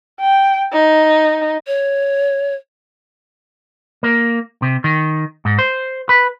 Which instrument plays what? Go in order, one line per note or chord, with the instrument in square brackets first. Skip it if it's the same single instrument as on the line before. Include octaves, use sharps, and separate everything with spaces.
[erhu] G5
D#4
[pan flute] C#5
[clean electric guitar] A#3
C3
D#3
G#2
C5
B4